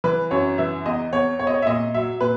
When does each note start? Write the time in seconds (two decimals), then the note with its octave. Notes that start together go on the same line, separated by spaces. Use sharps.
0.04 E3 B4
0.31 F#2 C#5
0.58 E3 E5
0.86 E2 D#5
1.13 E2 C#5
1.39 E2 C#5
1.47 D#5
1.54 C#5
1.62 E5
1.67 A#2 D#5
1.94 F#3 E5
2.20 A#2 B4